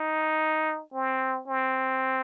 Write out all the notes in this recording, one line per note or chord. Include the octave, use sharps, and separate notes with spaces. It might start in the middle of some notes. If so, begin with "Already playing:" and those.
Already playing: D#4
C4
C4